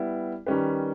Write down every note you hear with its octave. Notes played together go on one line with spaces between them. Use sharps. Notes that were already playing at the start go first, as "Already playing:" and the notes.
Already playing: G3 B3 E4
D#3 G3 C#4 G4 B4